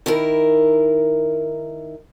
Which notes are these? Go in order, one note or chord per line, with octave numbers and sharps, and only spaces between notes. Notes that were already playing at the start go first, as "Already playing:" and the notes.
D#3 E4 A#4